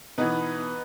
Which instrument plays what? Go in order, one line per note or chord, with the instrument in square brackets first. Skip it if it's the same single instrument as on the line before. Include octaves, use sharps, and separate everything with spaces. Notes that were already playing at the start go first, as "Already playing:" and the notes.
[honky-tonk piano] B2 E3 [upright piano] B3 D#4 B4